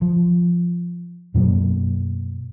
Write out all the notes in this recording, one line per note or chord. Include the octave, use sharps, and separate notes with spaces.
F3
F#2 B2 F#3 A#3